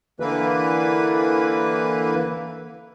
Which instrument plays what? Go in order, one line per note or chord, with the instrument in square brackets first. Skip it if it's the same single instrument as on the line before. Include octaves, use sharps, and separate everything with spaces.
[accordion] D3 E3 A#3 B4